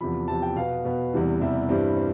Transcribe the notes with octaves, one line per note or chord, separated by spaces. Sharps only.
E2 C3 F3 B5
E2 C3 F3 A5
G5
B2 B3 F5
B2 B3
E2 C3 E3 G3
E2 C3 E3 G3 E5
G2 E3 G3 C4
C4